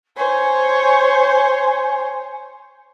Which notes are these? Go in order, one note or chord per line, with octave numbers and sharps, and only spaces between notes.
C5 C#5 G#5